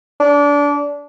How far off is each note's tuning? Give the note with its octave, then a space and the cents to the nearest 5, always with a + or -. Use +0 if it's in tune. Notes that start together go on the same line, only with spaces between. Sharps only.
D4 -25